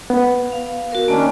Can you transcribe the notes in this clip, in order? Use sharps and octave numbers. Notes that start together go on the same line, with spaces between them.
B3
F5
F#4 A#4
D#3 A#3 C#4 D4 D#5